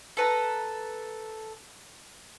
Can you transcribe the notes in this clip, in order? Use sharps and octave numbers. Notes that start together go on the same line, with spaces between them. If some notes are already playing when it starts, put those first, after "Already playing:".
A4 B4 A#5